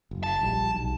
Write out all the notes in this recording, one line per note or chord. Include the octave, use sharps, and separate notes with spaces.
F#1
A5
A#1 F3 G3
B1